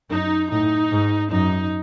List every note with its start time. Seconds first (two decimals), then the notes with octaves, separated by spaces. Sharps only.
0.10 F#2 D#4
0.50 A2 D#4
0.91 G#2
1.31 F#2 D#4